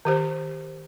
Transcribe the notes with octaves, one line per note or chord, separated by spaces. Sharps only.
D#3 G4 C5